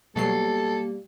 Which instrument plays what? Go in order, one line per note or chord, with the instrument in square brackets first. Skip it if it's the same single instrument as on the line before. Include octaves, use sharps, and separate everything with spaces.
[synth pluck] B2 F#3 C7 [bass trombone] G3 [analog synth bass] A#3 [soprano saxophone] A4